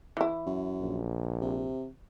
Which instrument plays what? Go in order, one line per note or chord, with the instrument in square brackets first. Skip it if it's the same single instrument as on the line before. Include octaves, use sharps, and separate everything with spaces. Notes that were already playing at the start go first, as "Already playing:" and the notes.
[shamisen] E3 E4
[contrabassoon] F#2
[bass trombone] A#1
[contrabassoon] C3